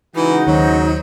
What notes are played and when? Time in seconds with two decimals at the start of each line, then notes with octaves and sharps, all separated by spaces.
0.16 C#3 E3 G#3 D#4 F#4
0.47 D#2 D#3 F#3 C5